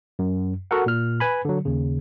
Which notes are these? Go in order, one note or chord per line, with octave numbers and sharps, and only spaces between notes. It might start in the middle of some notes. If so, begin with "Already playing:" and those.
F#2
F#4 A4 A#4 F#5
A#2 F6
B4 G#5 B5
D3 F#3
D#2 C#3